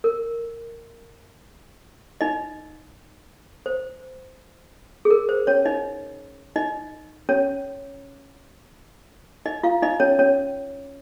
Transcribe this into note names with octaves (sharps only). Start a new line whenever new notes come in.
A#4
D#4 D#5
C5
G#4
A#4
C5
C#4 C#5
D#4 D#5
D#4 D#5
C#4 C#5
D#4 D#5
F4 F5
D#4 D#5
C#4 C#5
C#4 C#5